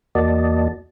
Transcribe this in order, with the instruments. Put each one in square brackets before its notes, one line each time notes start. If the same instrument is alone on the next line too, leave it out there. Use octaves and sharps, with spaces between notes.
[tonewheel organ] E2 A#3 F#4 D5 D#5 A5